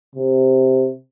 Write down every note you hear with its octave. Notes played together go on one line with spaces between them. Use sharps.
C3